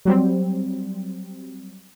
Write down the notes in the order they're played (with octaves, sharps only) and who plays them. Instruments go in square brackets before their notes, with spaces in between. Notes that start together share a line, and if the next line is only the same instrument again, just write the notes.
[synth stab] F#3 G3 C4